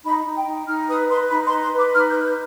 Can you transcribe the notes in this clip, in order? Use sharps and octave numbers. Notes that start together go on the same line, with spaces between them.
D#4 B5
D#4
G5
D#4
D#4 F6
B4 D#6
B4 C6
D#4 B5
C6
B4
C6
B4 D6
D#4 F6
G6
B4
G6